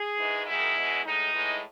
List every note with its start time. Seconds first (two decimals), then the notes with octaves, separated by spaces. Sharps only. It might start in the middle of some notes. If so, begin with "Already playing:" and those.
Already playing: G#4
0.18 G#2 E3 G#3
0.46 F#2 D#3 G#3 E4
0.76 E2 B2 G#3
1.04 A2 G#3 D#4
1.34 A2 E3 G#3